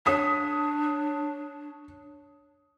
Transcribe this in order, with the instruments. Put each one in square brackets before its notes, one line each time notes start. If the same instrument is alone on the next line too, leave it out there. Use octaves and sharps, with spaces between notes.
[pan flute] D4 [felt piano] C#5 D#6 B6